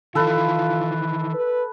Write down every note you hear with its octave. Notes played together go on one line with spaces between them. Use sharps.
D#3 E3 F4 A4 B4
B4